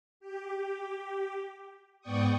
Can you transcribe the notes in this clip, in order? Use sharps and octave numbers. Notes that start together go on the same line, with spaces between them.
G4
G#2 B3 D5 G5 C#6 D#6